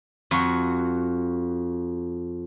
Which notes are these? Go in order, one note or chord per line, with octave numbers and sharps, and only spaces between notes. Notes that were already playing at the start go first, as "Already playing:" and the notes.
F2 F#4